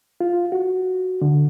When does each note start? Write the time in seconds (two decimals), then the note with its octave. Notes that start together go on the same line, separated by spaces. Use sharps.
0.21 F4
0.52 F#4
1.22 D3